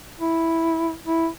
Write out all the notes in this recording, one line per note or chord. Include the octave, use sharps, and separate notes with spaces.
E4
E4